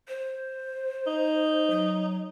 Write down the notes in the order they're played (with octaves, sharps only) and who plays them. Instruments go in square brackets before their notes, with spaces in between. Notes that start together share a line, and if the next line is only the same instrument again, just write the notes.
[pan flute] C5
[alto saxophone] D#4
[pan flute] F#3